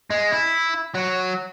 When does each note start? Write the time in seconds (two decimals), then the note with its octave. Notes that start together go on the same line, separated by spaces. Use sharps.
0.10 G#3
0.32 E4
0.95 F#3